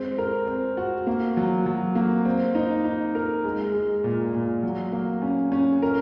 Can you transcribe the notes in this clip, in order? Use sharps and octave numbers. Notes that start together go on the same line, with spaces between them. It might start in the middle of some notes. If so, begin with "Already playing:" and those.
Already playing: G#3 C4
A#4
C4
F#4
A#3
F#3
F#3
A#3
C4
D#4
D#4
A#4
G#3
G#3
A#2
A#2
F#3
A#3
C#4
C#4
A#4